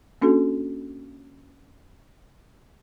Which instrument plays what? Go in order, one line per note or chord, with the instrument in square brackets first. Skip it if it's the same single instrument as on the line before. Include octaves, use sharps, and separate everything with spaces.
[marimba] A#3 C#4 D4 F#4 A4